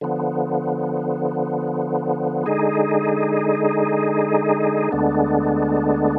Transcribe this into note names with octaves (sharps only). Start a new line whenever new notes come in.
D3 F3 B3
D3 G#3 D#4 G#4
D2 D3 G#3 B3 D4